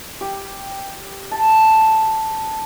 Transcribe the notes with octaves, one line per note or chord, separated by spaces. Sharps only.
G4
A5